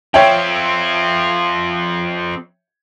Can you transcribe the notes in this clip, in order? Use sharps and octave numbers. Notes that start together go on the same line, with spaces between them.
F3 C4 C#5 E5 G5